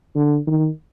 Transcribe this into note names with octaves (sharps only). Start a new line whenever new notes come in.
D3
D#3